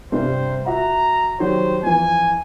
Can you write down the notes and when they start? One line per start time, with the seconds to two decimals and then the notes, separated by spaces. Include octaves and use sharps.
0.12 G2 C3 G3 C5
0.66 F#4 E5 F#5 A#5
1.40 D#3 F#3 G3 C5
1.83 F2 E3 G#5